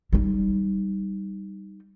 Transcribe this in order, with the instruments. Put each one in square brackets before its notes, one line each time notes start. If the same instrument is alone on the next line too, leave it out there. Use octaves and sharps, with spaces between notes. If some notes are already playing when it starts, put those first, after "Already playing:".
[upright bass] G3 D#4